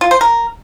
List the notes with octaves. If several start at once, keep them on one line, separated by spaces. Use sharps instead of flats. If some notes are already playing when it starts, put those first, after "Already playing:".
F4
C5
A#4